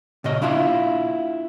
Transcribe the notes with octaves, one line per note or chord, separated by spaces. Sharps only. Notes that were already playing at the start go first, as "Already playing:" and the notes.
A#2 C#3 D#5
A#3 D4 E4 F4 E5 F5